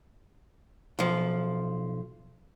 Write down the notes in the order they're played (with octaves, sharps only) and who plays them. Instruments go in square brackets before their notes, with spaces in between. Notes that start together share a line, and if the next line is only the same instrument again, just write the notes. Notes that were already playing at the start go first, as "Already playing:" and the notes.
[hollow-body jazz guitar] B1 F3